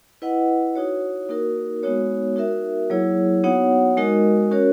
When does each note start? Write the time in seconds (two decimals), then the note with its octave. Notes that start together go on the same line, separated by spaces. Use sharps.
0.22 E4 B4 D#5 F#5
0.76 D#4 F#4 C#5
1.29 A#3 D#4 F#4 A#4
1.83 G#3 B3 D#4 F#4 C#5
2.36 D#4 F#4 A#4 E5
2.90 F#3 A#3 E4 G#4 C#5
3.44 B3 D#4 F#4 C#5 F#5
3.97 G#3 D#4 F#4 A#4 D#5
4.51 C#4 F#4 A#4 C#5